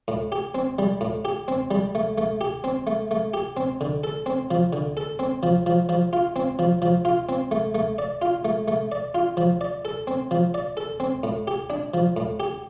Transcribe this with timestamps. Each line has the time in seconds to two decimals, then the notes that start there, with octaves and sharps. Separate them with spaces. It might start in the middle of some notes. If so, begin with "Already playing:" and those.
0.08 A2
0.32 G4
0.55 C4
0.79 G3
1.01 A2
1.25 G4
1.48 C4
1.71 G3
1.95 A3
2.18 A3
2.41 G4
2.64 C4
2.87 A3
3.11 A3
3.34 G4
3.57 C4
3.81 D3
4.04 A4
4.26 C4
4.51 F3
4.73 D3
4.97 A4
5.19 C4
5.43 F3
5.66 F3
5.89 F3
6.13 F4
6.36 C4
6.59 F3
6.82 F3
7.05 F4
7.29 C4
7.51 A3
7.75 A3
7.98 D5
8.22 F4
8.45 A3
8.68 A3
8.92 D5
9.15 F4
9.37 F3
9.61 D5
9.85 A4
10.07 C4
10.31 F3
10.54 D5
10.77 A4
11.00 C4
11.23 A2
11.47 G4
11.70 D4
11.94 F3
12.17 A2
12.40 G4